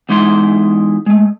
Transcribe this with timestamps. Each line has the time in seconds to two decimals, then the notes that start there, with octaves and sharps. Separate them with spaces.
0.09 E2 G#3 D#4 E4 C6
1.06 G#3 A3